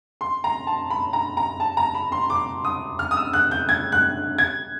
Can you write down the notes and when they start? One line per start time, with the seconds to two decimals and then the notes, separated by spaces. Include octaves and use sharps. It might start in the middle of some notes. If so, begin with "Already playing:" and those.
0.21 C6
0.44 A#5
0.67 A5
0.91 B5
1.13 A#5
1.37 A#5
1.60 A5
1.77 A#5
1.95 B5
2.12 C6
2.30 D6
2.64 D#6
2.99 F6
3.11 D#6
3.17 E6
3.33 F#6
3.51 G6
3.69 G#6
3.92 F#6
4.38 G#6